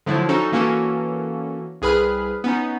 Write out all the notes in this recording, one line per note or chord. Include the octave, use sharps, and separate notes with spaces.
D3 F3 F#3 A3 E4
C#4 D#4 F#4 A4
E3 A#3 C#4 F#4 A4
C2 G#4 B4 B5 F6 F#6
B3 C#4 D#4